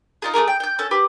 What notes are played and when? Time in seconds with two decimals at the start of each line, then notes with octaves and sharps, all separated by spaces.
0.22 D#4 F4 G#4
0.34 A3 A#3 G#4 A#4
0.48 G5
0.60 G5 G6
0.79 C#4 A4
0.91 G4 B4